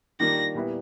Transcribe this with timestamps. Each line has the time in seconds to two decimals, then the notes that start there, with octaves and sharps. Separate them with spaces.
0.20 D#3 G3 A#3 D4 F4 A#6
0.55 A#2 G3 B3 E4